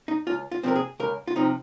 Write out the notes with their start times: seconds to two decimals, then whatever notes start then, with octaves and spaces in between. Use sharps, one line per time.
0.08 D#4
0.27 C#2 F4
0.52 F4
0.63 C3 F3 C4 A#4
0.75 G#4
1.00 C#2 A#4
1.27 F4
1.36 C3 F3 C4 D#4